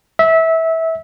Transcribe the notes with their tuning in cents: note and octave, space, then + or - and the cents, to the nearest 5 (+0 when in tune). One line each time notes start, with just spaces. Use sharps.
E5 -20